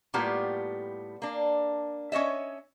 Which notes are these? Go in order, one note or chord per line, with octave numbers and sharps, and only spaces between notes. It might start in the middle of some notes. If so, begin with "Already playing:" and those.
A2 G3 A#3 B3 F4 G4
A#3 D4
C#4 C#5 D#5 E5